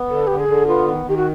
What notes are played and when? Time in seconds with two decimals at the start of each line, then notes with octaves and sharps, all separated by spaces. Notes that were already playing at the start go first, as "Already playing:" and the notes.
Already playing: B3
0.10 D3 A4
0.27 D3 G4
0.39 G#4
0.48 D3
0.67 B3 F4
0.87 D#3
1.05 D#3 G4
1.17 F#4